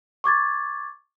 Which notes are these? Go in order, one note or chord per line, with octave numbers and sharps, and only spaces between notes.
C#6 D6 G#6 A6